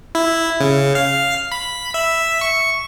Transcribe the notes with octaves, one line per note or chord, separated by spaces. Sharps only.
E4
C#3
F5
B5
E5
C#6